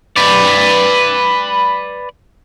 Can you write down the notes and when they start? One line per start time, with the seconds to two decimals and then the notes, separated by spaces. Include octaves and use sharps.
0.17 B4 D5